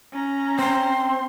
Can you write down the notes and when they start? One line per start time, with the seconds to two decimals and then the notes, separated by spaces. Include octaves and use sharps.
0.12 C#4 A#5
0.59 C4 C6